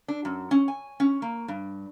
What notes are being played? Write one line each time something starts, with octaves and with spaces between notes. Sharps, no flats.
D4
F#2
C#4
G#5
C#4
A#3
G2